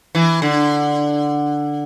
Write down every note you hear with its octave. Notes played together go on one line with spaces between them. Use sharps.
E3
D3